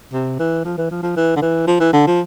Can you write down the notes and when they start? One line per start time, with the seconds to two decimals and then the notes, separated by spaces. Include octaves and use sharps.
0.13 C3
0.39 E3
0.65 F3
0.77 E3
0.91 F3
1.03 F3
1.16 E3
1.36 D3
1.42 E3
1.67 F3
1.80 E3
1.93 D3
2.07 F3